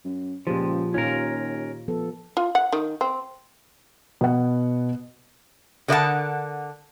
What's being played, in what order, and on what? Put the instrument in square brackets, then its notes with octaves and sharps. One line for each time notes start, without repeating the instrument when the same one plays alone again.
[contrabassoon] F#2
[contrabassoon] C#2 [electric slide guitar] A#2 F3 [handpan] G4 G#4 C5
[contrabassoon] D#2 [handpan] A#2 F4 [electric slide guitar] C#4 A#4
[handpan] F3 B3 A4
[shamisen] F4
F#5
D#3
C4
[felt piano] B2 F#5
[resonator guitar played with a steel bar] D3 A#4 D5 E5 F#5 A5